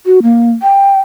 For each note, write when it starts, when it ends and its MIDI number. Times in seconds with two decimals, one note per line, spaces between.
0.06 0.19 66
0.23 0.52 58
0.63 1.00 79